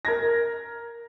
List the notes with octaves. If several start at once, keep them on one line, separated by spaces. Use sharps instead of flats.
A#4 G#6 A#6